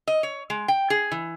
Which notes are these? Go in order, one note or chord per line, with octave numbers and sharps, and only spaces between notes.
D#5
C#5
G#3
G5
G#4
E3